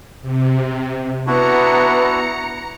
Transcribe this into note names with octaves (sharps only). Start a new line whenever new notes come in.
C3
B3 D4 E4 F#4 A#5 C#7